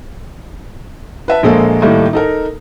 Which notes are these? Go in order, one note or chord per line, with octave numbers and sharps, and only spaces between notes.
B4 E5 A5
A#1 G#3 A#3 A4
A2 D#3 G3 A3 A#3
D#4 A4 A#4